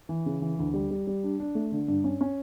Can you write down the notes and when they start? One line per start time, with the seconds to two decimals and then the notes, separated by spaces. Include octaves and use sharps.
0.09 E3
0.26 C#3
0.42 E3
0.59 D2
0.74 G3
0.91 G3
1.07 G3
1.24 D4
1.40 D4
1.55 A3
1.72 D3
1.88 G2
2.04 C#4
2.21 C#4